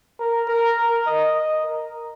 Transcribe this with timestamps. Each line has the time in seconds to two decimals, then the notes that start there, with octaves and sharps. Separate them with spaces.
0.19 A#4
0.48 A#4
0.77 A#4
1.06 D#5
1.35 D#5
1.64 A#4